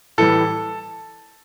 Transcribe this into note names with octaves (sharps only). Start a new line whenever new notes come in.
A2 E3 G3 A4